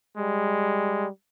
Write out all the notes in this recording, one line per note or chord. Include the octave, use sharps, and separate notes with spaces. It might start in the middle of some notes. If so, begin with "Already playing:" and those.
G3 G#3